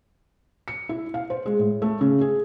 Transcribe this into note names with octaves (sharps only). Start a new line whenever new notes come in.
C#7
E4
F5
C5
G#3
A2
A3
C#3
G#4